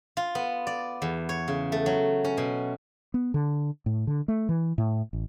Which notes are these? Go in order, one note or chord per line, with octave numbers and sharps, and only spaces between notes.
F4
B3
D5
E2
C#5
C#3
A3
F#3
C#4
B2
B3
D3
A2
D3
A3
E3
A2
A1